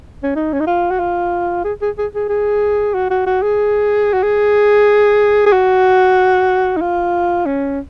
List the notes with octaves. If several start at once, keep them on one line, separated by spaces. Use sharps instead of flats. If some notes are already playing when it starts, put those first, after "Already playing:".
C#4
D#4
C#4
D#4
F4
F#4
F4
G#4
G#4
G#4
G#4
G#4
F#4
F#4
F#4
G#4
F#4
G#4
G#4
F#4
D#4
F4
C#4